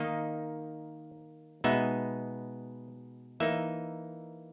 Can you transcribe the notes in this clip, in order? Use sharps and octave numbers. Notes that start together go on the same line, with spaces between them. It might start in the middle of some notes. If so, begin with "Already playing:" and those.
Already playing: D#3 A#3 D#4 D#5
B2 G#3 B3 D#4 E5
E3 A#3 D#4 E5